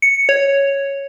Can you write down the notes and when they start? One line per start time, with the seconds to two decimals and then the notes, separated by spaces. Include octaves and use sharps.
0.02 C#7
0.29 C#5